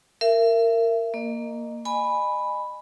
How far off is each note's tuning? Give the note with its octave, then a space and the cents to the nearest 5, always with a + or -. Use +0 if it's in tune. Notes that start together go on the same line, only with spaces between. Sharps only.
A#4 -20 E5 +30
A#3 +0 D#5 -25
D#5 -35 G#5 +0 B5 +0